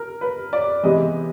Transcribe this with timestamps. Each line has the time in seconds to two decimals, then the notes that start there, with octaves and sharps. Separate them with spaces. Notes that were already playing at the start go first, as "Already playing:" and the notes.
Already playing: A#4
0.21 B4
0.53 D5
0.83 C3 E3 G#3 B3 D#5